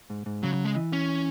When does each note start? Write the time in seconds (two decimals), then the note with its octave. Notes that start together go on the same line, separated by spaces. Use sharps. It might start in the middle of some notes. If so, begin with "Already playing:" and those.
0.10 G#2
0.26 G#2
0.43 C#3 F#3
0.54 F#3
0.64 G#3
0.76 E3
0.93 C#4